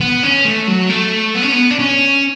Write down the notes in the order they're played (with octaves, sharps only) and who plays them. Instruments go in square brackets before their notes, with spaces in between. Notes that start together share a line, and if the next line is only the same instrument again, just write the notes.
[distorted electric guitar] B3
C#4
A3
F#3
A3
B3
C#4
B3
D4
C#4